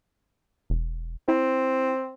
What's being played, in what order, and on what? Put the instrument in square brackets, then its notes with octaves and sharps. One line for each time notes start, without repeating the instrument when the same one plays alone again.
[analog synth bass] E1
[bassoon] C4 [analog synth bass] E4